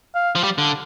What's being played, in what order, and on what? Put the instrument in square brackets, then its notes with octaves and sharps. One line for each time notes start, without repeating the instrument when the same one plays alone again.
[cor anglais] F5
[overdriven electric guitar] F3
G3
D3